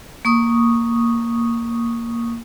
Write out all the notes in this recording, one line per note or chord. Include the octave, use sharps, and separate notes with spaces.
A#3 C#6 D#6